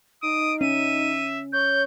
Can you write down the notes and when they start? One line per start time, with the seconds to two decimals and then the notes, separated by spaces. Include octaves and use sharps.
0.23 D#4 D#6 D7
0.61 C#4 E5 D#7
1.53 C#5 G6